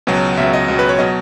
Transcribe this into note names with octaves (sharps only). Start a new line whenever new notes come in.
C#2 B2 F#3
C#2 B2 F#3 E5
D#5
C#2 B2 F#3
B4
C#5
B2 F#3 D#5